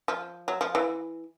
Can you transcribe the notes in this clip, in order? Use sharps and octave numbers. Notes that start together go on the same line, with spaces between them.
F3
F#3
F3
E3